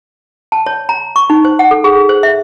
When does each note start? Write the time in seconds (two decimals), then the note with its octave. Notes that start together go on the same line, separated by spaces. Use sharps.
0.52 A5
0.66 C#5
0.89 A#5
1.16 C#6
1.30 D#4
1.45 C5
1.59 F#5
1.71 A4
1.84 G#4
2.09 C5
2.23 E5